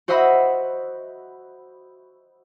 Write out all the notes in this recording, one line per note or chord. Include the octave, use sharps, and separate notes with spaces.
F#4 C5 D#5 E5 F#5 B5